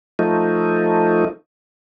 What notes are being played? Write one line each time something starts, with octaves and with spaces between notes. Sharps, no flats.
F3 A3 D#4